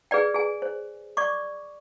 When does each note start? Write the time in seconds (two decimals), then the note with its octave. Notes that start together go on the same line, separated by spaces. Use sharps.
0.11 G#4 B4 D5 G5
0.34 G#4 G#5
0.62 C5
1.17 D5 C#6 D6